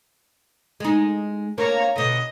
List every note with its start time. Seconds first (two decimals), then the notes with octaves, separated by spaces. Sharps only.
0.80 G#3 D#4
1.58 A#3 D4 C#5 A#5
1.96 B2 D3 D#5